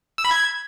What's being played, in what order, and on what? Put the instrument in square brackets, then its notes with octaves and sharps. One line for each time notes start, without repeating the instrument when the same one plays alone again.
[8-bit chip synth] E6
B5
G#6